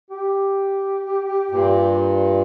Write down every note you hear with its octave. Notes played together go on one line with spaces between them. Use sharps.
G4
G2 A#2